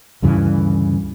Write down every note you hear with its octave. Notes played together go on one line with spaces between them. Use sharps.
D2 G2 C#3 E3